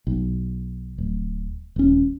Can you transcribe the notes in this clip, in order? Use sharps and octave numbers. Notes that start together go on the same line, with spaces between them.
B1
D1
D#1 C#4